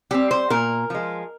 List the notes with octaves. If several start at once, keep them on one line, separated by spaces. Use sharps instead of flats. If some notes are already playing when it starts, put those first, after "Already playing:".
G3 C4 G4
C5
A#2 A#4
F3 G#3